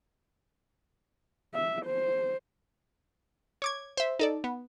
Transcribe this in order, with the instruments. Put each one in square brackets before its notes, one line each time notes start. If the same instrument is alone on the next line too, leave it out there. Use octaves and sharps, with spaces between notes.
[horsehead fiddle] E5
C5
[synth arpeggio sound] C#5 D6 G#6
C5 E5
D#4 A4 D5
B3